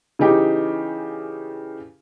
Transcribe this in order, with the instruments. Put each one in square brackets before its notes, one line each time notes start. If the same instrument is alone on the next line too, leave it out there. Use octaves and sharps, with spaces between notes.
[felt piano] C#3 E3 D#4 G4